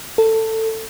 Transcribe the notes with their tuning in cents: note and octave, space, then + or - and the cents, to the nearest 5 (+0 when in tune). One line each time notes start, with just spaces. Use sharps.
A4 +20